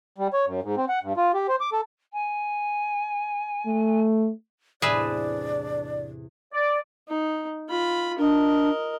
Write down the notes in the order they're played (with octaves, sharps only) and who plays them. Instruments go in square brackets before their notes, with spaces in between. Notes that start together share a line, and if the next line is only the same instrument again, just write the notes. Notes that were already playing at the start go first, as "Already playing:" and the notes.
[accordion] G3
C#5
F#2
G#2
C4
F#5
G2
F4
G4
C5
D6
A4
[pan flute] G#5
[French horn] A3
[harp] E2 A2 C3 [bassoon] D4 [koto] G#4 B4 E5 [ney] D5
[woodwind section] D5
[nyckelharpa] D#4
F4 B5
[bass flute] D4 [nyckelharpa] A#4 D#5